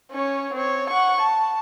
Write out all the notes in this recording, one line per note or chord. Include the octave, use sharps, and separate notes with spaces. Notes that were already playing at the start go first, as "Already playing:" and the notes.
C#4 C#5
C4 C#5
F#5 C#6
A5